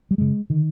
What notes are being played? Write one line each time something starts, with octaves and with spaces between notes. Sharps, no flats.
G3
F#2 C#3 G#3
D3 D#3